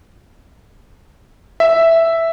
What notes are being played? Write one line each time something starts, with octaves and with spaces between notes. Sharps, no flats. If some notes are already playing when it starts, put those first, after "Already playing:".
E5